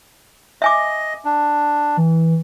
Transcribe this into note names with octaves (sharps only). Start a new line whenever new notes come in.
D#5 E5 G#5 D6
D4
E3